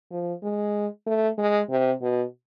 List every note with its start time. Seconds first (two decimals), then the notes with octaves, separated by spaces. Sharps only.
0.11 F3
0.42 G#3
1.06 A3
1.38 G#3
1.70 C3
2.01 B2